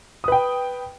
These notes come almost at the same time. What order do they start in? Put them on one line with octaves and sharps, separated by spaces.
D#6 B4 G5